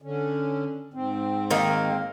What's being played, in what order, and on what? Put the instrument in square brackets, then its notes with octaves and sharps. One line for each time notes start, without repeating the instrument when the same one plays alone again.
[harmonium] D3 C#4
G#2 C4
[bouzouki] D#3 A#3